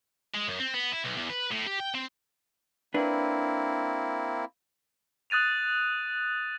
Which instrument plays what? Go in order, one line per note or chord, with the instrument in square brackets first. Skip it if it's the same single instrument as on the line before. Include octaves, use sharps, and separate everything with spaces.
[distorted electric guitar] G#3
F#2
C4
B3
E4
B1
E2
B4
A2
G4
G5
C4
[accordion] A#3 C4 E4 [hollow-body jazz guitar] D4 B4
[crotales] D#6 F#6 A6 D#7 F7